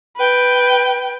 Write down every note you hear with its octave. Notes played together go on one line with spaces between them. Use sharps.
B4 G5